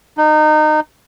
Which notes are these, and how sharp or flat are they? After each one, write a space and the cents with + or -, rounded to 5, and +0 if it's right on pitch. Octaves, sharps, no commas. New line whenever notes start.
D#4 -25